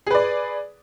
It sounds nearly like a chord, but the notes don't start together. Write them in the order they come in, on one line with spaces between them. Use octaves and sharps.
G#4 B4 D5